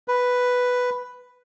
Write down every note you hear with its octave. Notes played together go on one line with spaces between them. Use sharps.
B4